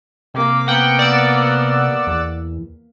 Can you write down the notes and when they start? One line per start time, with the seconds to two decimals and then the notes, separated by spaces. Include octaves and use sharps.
0.34 C3 A#3 D6
0.68 A#3 B3 F#5 G5
0.99 D5 F#5 E6
2.07 E2